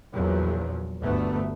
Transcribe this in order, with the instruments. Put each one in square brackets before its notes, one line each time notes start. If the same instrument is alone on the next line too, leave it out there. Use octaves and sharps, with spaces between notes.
[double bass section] A#1 E2 A#2 F3 F#3
G1 D2 A3 B3